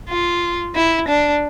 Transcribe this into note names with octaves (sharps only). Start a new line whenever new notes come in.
F4
E4
D4